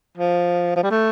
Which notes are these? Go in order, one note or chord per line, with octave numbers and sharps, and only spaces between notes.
F3
F3
G3
A3